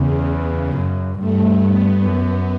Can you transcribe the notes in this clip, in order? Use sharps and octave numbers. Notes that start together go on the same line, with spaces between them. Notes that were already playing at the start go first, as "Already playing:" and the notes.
Already playing: E2 C#3
F#2
G2 A3
B3
F#2 B3